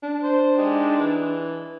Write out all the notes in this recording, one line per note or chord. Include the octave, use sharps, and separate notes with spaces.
D4
C5
G#3 D#4 G4
E3